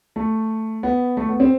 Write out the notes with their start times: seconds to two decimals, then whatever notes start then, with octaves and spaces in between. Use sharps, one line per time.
0.16 A3
0.83 B3
1.17 A3
1.29 B3
1.40 C4